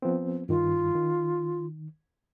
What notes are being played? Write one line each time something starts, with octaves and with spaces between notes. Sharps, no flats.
F3 B3 C4
G2 D#3 F4
D#3